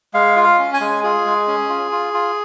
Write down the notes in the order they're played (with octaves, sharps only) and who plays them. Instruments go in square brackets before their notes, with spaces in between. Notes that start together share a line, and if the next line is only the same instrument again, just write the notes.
[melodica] G#3 F5
F4
F5
C#4
G#5
G#3
F4 G#4
G#3
C#4
F4
F4
F4